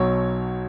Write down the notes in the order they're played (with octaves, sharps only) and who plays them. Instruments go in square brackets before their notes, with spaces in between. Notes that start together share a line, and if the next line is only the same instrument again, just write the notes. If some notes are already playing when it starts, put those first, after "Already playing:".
Already playing: [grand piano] B1 B2 F#3 C#5